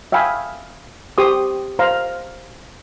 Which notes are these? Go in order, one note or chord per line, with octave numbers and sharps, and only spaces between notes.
E5 F5 G5 G#5 B5 D#6
G4 C5 C6 C#6 D#6
C5 F5 A#5